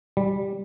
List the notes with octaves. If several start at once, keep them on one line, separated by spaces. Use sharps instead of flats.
G3